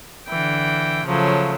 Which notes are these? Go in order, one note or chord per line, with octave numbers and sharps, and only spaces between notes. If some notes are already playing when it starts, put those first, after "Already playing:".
D3 E3 G5
C#3 F3 F#3 A3